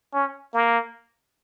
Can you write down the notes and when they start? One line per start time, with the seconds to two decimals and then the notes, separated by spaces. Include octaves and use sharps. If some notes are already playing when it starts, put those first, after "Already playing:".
0.14 C#4
0.54 A#3